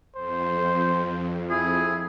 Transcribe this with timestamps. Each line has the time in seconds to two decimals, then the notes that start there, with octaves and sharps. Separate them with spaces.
0.16 F2 C5
1.50 E4 G#4